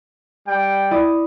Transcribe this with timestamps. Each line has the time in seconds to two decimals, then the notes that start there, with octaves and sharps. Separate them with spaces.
0.48 G3 G5
0.91 E4 D5 D#6